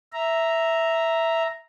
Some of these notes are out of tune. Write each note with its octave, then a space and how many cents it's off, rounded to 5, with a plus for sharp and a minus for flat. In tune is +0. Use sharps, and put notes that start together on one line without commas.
E5 +0 A#5 +0